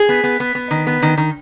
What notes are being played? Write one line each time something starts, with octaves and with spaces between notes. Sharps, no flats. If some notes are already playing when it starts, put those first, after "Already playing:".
Already playing: G#4
B3
B3
B3
B3
D#3
B3
D#3
D#3